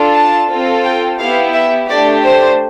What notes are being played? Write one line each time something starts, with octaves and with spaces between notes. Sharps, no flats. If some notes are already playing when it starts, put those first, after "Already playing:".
Already playing: D4 F4 A4
A5
C4 F4 A4
G5
B3 E4 G4 F5
E5
A3 D4 G4 D5
C5